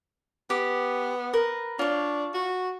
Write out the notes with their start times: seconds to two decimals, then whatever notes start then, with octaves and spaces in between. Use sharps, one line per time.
0.50 B3 G4
1.34 A#4 B4
1.79 D4 F4 C#5
2.34 F#4